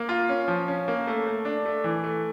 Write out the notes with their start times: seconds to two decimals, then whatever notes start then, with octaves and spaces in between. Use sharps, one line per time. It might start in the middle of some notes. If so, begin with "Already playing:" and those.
Already playing: A#3
0.09 F4
0.29 C#4
0.48 F3
0.68 C#4
0.88 A#3
1.07 A3
1.26 A3
1.45 D4
1.65 A3
1.84 E3
2.04 A3